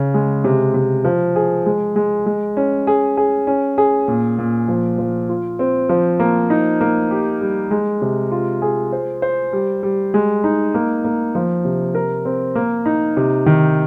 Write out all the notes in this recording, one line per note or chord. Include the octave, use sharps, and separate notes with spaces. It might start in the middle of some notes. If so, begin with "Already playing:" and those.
Already playing: C#3
G#3
C3
C3
F3
G#4
G#3
G#3
G#3
C#4
G#4
G#4
C#4
G#4
A#2
A#2
F3
F3
F4
C4
F3
A#3
D#4
A#3
G4
G3
G#3
C3
F4
G#4
C5
C5
G3
G3
G#3
D#4
A#3
A#3
F3
C3
A#4
C4
A#3
D#4
C3
D#3